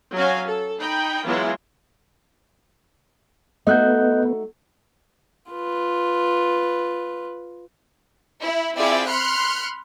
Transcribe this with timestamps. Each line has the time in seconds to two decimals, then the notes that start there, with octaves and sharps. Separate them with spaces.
0.14 F#3 C#4 F#4 F5 G#5
0.47 A4
0.79 D#4 G5 B5
1.25 E3 F#3 G#3 B3 E4 F4
3.67 A3 B3 D#4 F#4 D#5 F#6 G6
5.51 F4 B4
8.39 E4
8.76 C4 E4 F4 G#4 D5 G5
9.08 B5 C6 F6 F#6 C#7